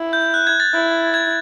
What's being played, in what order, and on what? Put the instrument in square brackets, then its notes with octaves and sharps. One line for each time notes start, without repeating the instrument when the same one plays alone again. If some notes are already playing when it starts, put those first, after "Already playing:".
Already playing: [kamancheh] E4
[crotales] G6
F#6
G#6
A6
[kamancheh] E4
[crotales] G#6